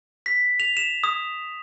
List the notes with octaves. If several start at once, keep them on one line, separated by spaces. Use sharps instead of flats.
B6
F7
E7
D#6